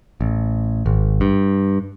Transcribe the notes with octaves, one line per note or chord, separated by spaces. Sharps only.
A1
G#1
G2